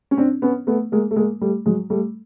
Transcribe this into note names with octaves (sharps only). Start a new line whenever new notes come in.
C#4
C4 D4
B3 C#4
A3 B3
G#3 A#3
A3
G#3 A#3
G3 A3
F#3 G#3
G3 A3